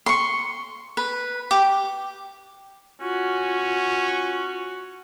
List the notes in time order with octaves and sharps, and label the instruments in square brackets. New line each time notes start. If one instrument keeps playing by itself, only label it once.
[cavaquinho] C6 C#6
B4
G4
[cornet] C#4 [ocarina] F4 [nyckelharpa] F#4